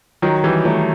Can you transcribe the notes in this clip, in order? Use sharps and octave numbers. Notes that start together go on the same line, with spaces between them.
D#3 F#3
E3 G3
F#3 A3